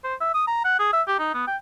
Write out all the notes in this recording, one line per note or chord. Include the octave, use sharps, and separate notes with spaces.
C5
E5
D#6
A#5
F#5
G#4
E5
G4
D#4
B3
G5